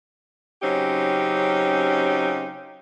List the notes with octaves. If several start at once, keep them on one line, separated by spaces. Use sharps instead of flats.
C#3 F#3 C4 C#4 D#4 G4